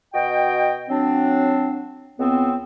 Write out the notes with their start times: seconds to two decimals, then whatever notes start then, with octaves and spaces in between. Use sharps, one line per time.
0.13 B2 F#4 D#5 G5
0.89 F#3 C4 D4
2.18 C#2 B3 C4